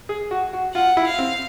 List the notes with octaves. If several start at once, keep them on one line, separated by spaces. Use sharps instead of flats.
G#4
F#4
F#4
F4 F#5
E4
F5
C4